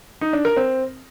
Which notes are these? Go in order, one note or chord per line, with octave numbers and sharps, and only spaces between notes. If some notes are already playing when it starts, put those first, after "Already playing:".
D#4
D4
A#4
C4